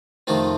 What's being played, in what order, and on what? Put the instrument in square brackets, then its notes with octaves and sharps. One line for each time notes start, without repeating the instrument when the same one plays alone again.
[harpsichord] F2 C3 D#3 A3 C4 F4